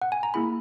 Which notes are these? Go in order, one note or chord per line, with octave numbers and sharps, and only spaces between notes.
F#5
G#5
A#5
A#3 E4 G#4 B5